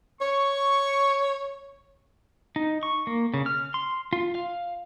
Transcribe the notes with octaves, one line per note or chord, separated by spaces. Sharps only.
C#5 C#6
D#4
C#6
A#3
C#3
F6
C6
F4
F5